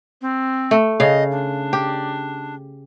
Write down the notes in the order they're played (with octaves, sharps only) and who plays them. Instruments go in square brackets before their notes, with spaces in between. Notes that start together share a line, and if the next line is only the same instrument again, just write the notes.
[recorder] C4
[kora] A3
[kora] C#3 F5 [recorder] D#5
[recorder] D4
[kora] G4